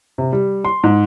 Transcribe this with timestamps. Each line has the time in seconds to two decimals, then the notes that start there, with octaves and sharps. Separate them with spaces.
0.18 C3
0.33 G3
0.65 C6
0.84 G#2